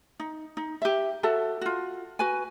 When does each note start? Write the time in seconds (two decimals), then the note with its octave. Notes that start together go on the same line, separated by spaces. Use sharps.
0.20 D#4
0.57 D#4
0.82 G4 E5
1.23 F#4 A4 E5 A5
1.61 F4 F#4
2.19 F#4 B4 G#5